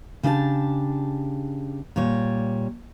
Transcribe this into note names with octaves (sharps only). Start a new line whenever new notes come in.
C#3 D4 G4 D#5 A5
A#2 G3 C#5